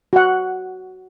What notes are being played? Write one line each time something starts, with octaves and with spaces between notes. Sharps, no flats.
F#4 F#5